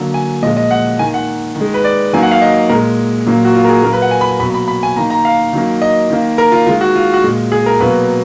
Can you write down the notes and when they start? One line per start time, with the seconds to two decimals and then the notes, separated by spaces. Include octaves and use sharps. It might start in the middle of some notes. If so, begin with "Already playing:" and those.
Already playing: D3 F#3 A#3
0.14 G#5
0.42 A#2 F3 G#3 D#5
0.57 D#5
0.71 F#5
0.99 D#3 A#3 G#5
1.14 F#5
1.56 D#3 G#3
1.74 B4
1.84 D5
2.13 D#3 F#3 A#3 G#5
2.22 F#5
2.31 F5
2.42 D#5
2.69 A#2 G#3 A#4
3.26 A#2 F#3 A#3
3.45 F#4
3.55 F4
3.64 A#4
3.69 G#4
3.83 A#2 F#3 A#3 A#4
3.93 B4
4.02 F#5
4.11 G#5
4.21 B5
4.40 B2 F#3 A#3 B5
4.54 B5
4.68 B5
4.83 G#5
4.96 D#3 A#3 A#5
5.10 A#5
5.25 F5
5.53 D#3 F#3 A#3
5.82 D#5
6.10 D#3 A#3
6.38 A#4
6.52 F4
6.67 D#3 G#3 F4
6.81 F#4
6.95 F4
7.14 F#4
7.24 A#2 G#3
7.52 G#4
7.66 A#4
7.80 B2 F#3 A#3 B4